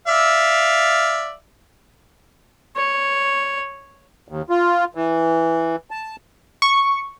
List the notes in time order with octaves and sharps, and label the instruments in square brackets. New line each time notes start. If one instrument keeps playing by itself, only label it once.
[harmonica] D5 E5 F5
[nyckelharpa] C#5
[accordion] D#2
F4
E3
A5
[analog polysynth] C#6